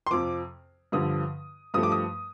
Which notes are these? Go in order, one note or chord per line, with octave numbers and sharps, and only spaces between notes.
C6
F2 C3 F3 D6
G2 D3 F3 D#6
G2 F3 A3 D#6
D6
D#6